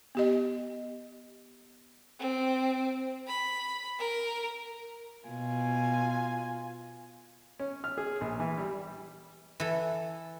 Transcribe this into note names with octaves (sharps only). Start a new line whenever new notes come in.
B3 G4 D#5
C4
B5
A#4
B2 F4 G#5
C#4
F6
G#4
A#1
E3
G3
E3 A4